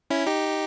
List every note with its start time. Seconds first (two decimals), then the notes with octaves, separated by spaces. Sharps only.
0.10 C#4 E4
0.26 D#4 G4